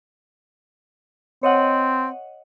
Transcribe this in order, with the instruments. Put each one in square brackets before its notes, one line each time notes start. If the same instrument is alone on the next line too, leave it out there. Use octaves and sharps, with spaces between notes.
[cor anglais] C4 [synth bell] C#5 D#5 F#5